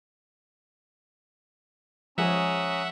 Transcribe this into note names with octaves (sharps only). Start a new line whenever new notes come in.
F3 G#3 C#4 G#4 E5 F#5 A#5 D#6